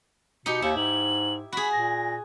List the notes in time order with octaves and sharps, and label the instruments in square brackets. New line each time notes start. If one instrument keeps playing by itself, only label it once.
[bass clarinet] B2 [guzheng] D#4 G4 [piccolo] C#7
[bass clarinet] D#2 [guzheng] E4
[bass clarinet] G#2 [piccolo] F#7
[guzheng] F#4 G#4 [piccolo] B5
[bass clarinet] A#2 [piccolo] A#6